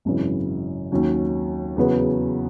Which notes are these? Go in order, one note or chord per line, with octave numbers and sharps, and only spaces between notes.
G#1 F#2 C#3 E3
D#2 D#3 F#3 C#4
E2 C#3 F#3 B3